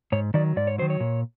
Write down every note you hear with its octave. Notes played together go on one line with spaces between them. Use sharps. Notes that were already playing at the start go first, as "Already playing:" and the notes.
G#2 C#5
D#3 F#3 D5
G#2 D5
C#5
D#3 F#3 C5
C#5
A#2